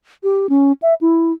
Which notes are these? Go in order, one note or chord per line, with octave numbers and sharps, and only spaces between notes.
G4
C#4
E5
E4